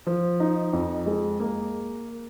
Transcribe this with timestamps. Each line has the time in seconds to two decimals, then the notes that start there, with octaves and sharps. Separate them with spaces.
0.07 F3
0.40 D#4
0.73 F2
1.06 G#3
1.40 A#3